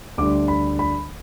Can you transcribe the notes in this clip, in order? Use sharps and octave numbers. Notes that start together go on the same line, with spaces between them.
D2 D3 G3 D4 D6
B5
B5